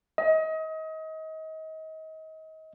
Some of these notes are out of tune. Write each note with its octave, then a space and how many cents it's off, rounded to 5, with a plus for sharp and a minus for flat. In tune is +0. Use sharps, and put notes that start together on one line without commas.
D#5 +30